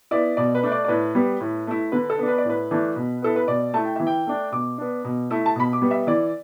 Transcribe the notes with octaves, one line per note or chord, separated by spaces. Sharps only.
B3 E4 D5
B2 D5
B4
A3 D4
D5
D5
A2 B4
G3 B3
A2
A3 E4
D3 B4
A4
B3 D4
B4
D5
A2
B4
E3 A3 D4
B2
B3 E4 A4
B4
B2 D5
A3 E4 A5
G5
E3 E5
G5
A3 D4
B2 D6
B3 D4
B2
A3 E4
A5
B2 B5
D6
G3 B3
E5
E3 D5